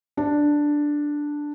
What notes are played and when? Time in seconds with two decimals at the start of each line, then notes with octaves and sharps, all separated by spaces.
0.17 D4